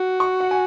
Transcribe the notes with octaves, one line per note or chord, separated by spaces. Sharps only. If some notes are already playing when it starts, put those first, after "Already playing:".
Already playing: F#4
C#6
F#5
G#5